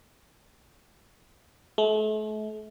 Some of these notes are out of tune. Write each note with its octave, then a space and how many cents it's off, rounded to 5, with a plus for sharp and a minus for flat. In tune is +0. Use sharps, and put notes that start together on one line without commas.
A3 -40